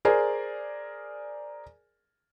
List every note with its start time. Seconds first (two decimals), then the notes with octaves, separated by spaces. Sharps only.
0.05 G#4 A#4 C5 D5 G#5